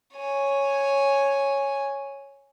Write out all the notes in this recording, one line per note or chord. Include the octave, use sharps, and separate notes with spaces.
C#5 G#5